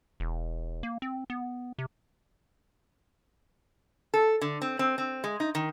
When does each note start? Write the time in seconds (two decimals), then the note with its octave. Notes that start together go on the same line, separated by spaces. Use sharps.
0.20 E1
0.83 A#3
1.02 C4
1.30 B3
1.79 C3
4.14 A4
4.41 D3
4.62 C4
4.79 C4
4.98 C4
5.24 G#3
5.40 D#4
5.55 D#3